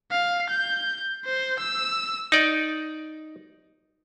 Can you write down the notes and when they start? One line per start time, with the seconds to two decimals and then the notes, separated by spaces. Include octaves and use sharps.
0.12 F5
0.50 G6
1.25 C5
1.59 E6
2.32 D#4 D5